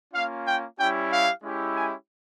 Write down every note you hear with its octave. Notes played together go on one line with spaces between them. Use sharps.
A#3 C#4 F4 F5
G5
G3 C#4 E4 G4 G5
F5
G#3 C#4 E4 G4
G#5